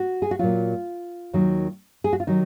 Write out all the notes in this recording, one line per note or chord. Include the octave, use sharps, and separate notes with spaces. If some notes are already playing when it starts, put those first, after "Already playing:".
Already playing: F#4
G#4
F#4
A#2 F#3 F4
D#2 D#3 F#3
G#4
F#4
F4
D#3 F#3 D#4